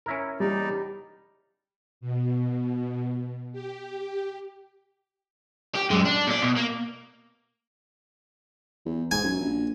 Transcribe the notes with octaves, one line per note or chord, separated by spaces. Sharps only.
C#4 E4 A#4
E2 G3 D#4 D5
B2
G4
G4
F#2 G#3
D4
A#2 D5
B2
A#3
E2
G#2 G#5
F#2
A#1